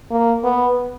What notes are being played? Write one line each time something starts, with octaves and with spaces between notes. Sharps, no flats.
A#3
B3